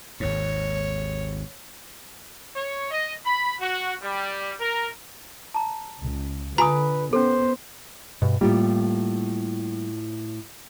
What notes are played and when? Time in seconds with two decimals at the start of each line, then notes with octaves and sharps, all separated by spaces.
0.20 G#1 D#2 G#2 C#5
2.56 C#5
2.91 D#5
3.24 B5
3.60 F#4
4.02 G3
4.59 A#4
5.54 A5 A#5
6.00 C#2
6.58 D3 F4 B4 G#5 A#5 D#6
7.13 B3 C#4 A4 C5
8.22 G2 B2
8.41 A2 G3 A#3 F4 G4